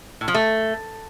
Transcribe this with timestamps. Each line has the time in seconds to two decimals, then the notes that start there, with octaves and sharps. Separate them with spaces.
0.21 A2
0.28 F3
0.35 A3